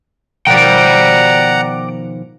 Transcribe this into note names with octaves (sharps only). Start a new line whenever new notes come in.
B2 D#3 F3 D5 F#5 G5 A#5